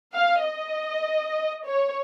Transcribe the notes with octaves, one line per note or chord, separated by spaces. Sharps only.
F5
D#5
C#5